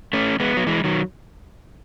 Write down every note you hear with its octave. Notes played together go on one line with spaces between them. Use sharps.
A3 C#4
G#3 B3
F#3
E3 G#3
D#3 F#3